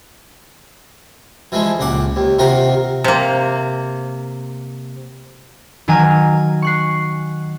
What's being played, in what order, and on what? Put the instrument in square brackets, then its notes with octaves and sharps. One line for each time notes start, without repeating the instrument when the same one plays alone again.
[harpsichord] E3 F3 G#3 A3
C#2 A#2 F#5 D6
D#2
C3 D#3 F4 A#4 F#5
[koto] C3 A#3
[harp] D#3 F#3 G#5 A#5 F6 D#7
C#6 F#6 C7